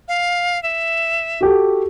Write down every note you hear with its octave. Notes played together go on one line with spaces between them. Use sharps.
F5
E5
F#4 G4 A4